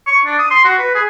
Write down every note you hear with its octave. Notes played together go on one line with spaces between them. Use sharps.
C#6
D4
D#6
C6
F#4
B4
G#4